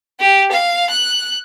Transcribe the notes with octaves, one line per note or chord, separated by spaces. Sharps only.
G4
F5
F#6